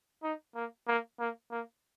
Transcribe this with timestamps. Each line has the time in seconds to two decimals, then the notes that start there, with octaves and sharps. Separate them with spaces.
0.23 D#4
0.55 A#3
0.88 A#3
1.20 A#3
1.51 A#3